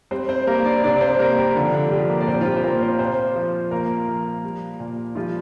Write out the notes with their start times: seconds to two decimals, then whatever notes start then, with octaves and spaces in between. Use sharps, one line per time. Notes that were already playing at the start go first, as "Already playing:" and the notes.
0.11 G3 C4 C5
0.29 C4 C5
0.47 G3 A#3 A#4
0.65 D4 D5
0.84 C3 D4 D5
1.01 C4 C5
1.19 G3 A#3 A#4
1.37 G3 G4
1.56 D3 F3 D4
1.74 D3 D4
1.91 F3 G3 G4
2.09 A#3 A#4
2.21 D5
2.27 A#2 C4 C5
2.41 F4
2.46 G3 G4
2.56 C5
2.63 A#2 A#3 A#4
2.81 C4 C5
2.99 A#2 C4 C5
3.36 F3
3.71 A#2 A#3 A#4
4.08 F3
4.44 G3
4.80 A#2
5.15 F3 G3 F4